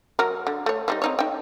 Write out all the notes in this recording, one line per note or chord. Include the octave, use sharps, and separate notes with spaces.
F#3 A#4
D3
A3 C#5
F3 G3 D#4
C4 D#4 C#5
D#4 G5